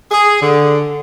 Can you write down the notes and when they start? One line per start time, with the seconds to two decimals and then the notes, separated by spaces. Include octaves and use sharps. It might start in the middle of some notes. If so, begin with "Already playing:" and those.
0.11 G#4
0.41 D3